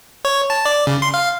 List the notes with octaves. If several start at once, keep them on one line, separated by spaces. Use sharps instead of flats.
C#5
A5
D5
C#3
C6
F5